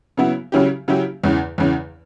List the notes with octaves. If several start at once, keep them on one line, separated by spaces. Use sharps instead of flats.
C#3 F#3 B3 E4
C#3 F#3 C#4 E4 G4
C#3 F#3 C#4 E4 G4
E2 C#3 E3
E2 C#3 E3